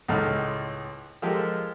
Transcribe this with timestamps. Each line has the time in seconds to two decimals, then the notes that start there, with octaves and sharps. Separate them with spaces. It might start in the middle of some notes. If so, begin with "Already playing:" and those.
0.09 C#2 A2 G#3 D#4 A5 F6
1.22 F3 G#3 G4 A4 A#4